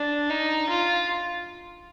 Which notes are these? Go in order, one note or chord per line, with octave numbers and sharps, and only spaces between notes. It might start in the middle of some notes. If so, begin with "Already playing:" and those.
Already playing: D4
D#4
F4